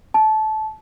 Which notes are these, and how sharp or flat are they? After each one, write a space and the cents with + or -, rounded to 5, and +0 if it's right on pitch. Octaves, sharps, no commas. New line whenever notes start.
A5 -20